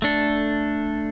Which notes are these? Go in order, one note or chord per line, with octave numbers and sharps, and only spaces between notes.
A3 D4 A4